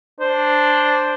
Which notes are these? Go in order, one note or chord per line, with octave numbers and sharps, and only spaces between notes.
D4 C5